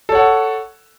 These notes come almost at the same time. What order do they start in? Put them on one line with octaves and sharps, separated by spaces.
A4 C#5 F#5